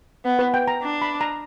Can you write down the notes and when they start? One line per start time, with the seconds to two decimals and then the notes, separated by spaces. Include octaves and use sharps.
0.25 B3
0.39 B4
0.54 G5
0.68 A#5
0.83 D4
1.02 B5
1.21 A#5